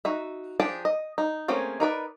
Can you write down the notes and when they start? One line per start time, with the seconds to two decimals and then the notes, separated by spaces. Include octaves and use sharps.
0.05 D#4 F#4 E5
0.60 F3 D4 G4 G#4 A5
0.85 D#5
1.18 D#4
1.48 A3 A#3 C4 C#4 G#4
1.80 D#4 A#4 B4 D5